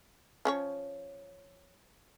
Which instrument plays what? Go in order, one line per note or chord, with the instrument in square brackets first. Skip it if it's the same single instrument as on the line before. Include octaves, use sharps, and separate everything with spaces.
[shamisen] F3 C#4 C#5